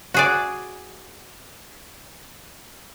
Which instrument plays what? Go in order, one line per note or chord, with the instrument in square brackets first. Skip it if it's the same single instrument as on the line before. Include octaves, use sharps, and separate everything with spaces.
[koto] F#4 G#4 D5